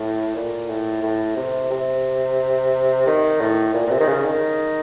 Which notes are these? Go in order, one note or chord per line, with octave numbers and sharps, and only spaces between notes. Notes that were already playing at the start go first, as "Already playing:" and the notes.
Already playing: A2
A#2
A2
A2
C3
C3
D#3
A2
A#2
A#2
C3
D#3
C#3
D#3